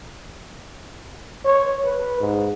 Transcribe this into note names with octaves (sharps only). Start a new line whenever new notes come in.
C#5
B4
G#2